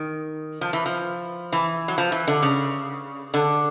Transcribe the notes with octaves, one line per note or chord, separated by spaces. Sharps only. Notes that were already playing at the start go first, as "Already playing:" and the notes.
Already playing: D#3
F3
E3
F3
E3
F#3
F3
E3
D3
C#3
D3